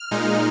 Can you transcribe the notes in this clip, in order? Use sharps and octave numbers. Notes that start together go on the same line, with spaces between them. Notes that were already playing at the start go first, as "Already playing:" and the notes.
Already playing: F6
A#2 G#3 D#4